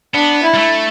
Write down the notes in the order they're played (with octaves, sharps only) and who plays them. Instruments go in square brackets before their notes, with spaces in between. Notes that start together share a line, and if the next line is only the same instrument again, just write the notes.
[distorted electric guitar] B3 [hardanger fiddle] D4
[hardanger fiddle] E4
[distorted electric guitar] G3
A3